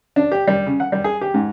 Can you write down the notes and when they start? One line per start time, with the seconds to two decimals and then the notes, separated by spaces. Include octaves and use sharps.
0.16 D4
0.32 G4
0.48 G3
0.66 C#3
0.80 F#5
0.92 G3
1.04 G#4
1.21 G4
1.34 G#2